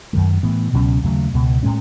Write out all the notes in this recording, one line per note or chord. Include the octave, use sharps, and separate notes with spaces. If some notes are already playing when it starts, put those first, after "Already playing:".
F#2 D#3 G#3
A2 E3 B3
C#2 B2 F#3 C#4
D#2 C#3 F#3 A3
C#2 B2 G#3
A2 G#3 C#4